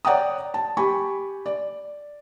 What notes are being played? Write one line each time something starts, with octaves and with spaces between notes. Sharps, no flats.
C#5 D5 F#5 G5 A#5 D#6
A5
G4 G#5 B5 C#6
D5